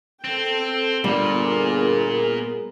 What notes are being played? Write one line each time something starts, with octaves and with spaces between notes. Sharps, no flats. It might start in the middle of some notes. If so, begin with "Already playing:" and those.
C4 A4 G5
G1 A#2 G3 B3 G#4 A#4